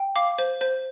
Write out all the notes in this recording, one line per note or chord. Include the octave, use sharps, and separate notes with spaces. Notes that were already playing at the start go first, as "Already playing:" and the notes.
Already playing: G5
F5 D6
C5
C5